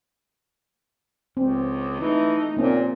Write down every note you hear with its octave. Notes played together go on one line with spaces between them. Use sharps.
C#2 C4
E3 A3 D#4
A#2 A#3 C4 C#4